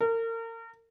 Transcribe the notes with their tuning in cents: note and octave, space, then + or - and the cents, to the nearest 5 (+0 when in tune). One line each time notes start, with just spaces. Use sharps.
A#4 -35